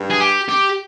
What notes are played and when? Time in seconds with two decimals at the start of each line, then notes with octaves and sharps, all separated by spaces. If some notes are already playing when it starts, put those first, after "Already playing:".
Already playing: G2
0.11 G#4
0.21 G4
0.49 G4